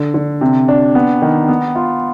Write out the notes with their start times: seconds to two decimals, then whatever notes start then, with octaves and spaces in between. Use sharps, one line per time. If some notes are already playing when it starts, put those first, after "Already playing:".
Already playing: D3
0.14 D3
0.41 C3
0.68 D4
0.95 B3
1.22 D#3
1.48 B3
1.75 F4